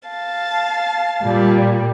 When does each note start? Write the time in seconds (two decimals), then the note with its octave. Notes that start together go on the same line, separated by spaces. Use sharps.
0.08 F5 A5
1.22 A#2 G3